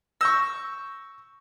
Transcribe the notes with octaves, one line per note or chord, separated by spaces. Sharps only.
C#6 E6 G6 A#6